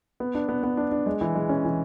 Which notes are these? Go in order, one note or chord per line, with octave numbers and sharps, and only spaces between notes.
B3
D4
B3
B3
D4
D4
G#3
E3
G#3
C#4
E3